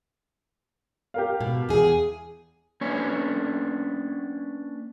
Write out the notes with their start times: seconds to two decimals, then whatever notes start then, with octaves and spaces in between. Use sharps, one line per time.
1.14 G4 A#4 F5
1.41 B2
1.69 E2 G#4
2.81 A#3 C#4 D4 B4 C#5 G#5